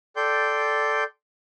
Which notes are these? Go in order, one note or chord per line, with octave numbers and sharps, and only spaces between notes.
A4 D5 G5 C6 G6